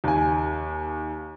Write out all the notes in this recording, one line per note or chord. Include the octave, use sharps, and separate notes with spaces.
D#2 G#5